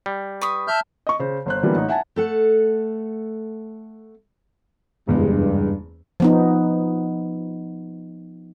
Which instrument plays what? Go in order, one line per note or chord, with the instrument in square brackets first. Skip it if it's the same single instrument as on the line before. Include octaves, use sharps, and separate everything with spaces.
[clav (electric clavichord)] G3
[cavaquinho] B4 C#6 D#6
[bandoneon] E5 F6 G6 [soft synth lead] A5
[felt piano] D#5 C#6
C#3 C5
G1 C5 F#6
D3 E3 F#3 G3 A#3 B3
A1 D#4
E5 F#5 G#5 A5
[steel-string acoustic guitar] A3 A4 F#5
[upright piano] F#1 E2 G#3 [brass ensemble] G2
[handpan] F3 B3 D#4